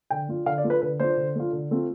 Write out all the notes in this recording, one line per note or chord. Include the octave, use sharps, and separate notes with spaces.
D3 G5
A3 D4 F4
D3 F5
D5
A3 D4 F4
B4
D3 B4
A3 D4 F4 C5
D3
A3 D4 F4
D3
A3 C4 F4